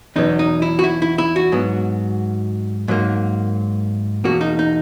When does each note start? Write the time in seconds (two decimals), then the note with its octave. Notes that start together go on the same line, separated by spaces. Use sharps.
0.16 E2 B2 F#3 B3 D#4
0.39 D#4
0.62 E4
0.79 F#4
0.84 E4
1.02 E4
1.18 E4
1.36 F#4
1.52 G#2 F#3 B3
2.88 G#2 F#3 A#3
4.24 E2 B2 A#3 F#4
4.41 D#4
4.59 D#4